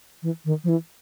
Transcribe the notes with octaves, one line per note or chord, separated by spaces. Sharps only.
E3
D#3
F3
E3